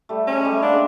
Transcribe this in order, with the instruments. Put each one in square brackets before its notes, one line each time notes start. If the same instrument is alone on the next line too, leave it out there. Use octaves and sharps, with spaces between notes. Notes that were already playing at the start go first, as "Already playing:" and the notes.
[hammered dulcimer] G3 A3
[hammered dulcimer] G#3 [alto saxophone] C#4
[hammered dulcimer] G3 A3
[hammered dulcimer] G#3 A#3 [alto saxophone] D4